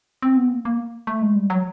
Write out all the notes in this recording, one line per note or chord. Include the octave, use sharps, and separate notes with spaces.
C4
B3
A#3
A#3
A3
G#3
G3
F#3